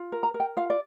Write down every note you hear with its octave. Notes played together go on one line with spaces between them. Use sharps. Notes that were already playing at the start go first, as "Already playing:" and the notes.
Already playing: F4
A#4
A#5
A#4
G5
F4 F5
D5